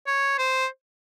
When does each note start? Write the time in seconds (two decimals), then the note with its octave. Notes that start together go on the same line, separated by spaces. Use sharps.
0.07 C#5
0.38 C5